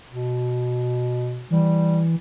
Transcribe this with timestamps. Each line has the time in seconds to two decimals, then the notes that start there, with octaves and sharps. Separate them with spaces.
0.10 B2
1.51 E3 G3